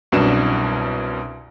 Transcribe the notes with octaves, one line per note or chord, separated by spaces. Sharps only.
C2 F#2 B2 D4 E7